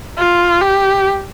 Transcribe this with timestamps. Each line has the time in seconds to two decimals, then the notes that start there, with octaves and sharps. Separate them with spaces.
0.18 F4
0.61 G4